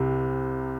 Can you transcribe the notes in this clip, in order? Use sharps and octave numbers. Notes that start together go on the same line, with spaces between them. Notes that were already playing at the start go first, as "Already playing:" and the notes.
Already playing: C2 C3